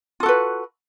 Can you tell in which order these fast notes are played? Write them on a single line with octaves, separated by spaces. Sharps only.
F4 A4 F#4 B4